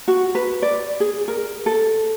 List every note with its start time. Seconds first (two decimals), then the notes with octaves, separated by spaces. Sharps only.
0.08 F#4
0.35 B4
0.62 D5
1.00 G#4
1.28 A#4
1.66 A4